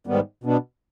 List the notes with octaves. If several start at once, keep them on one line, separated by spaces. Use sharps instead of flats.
G#2 D#3 G3 B3
B2 B3 D4